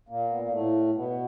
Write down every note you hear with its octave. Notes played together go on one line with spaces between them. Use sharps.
A#2 A#3
B3
A#3
A2 A3
B2 B3